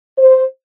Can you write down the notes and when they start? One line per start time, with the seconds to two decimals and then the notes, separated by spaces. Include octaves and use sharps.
0.16 C5